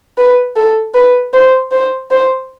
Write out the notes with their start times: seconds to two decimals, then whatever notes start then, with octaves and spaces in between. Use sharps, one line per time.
0.18 B4
0.56 A4
0.94 B4
1.33 C5
1.71 C5
2.11 C5